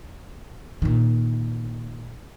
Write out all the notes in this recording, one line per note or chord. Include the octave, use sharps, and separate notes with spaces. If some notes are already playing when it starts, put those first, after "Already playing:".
A#2 D#3